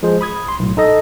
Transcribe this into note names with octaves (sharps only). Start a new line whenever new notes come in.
F3 G#3 G#4 C5
B5 D#6 G#6
B1 C6
B1 A2
D#4 A4 D#5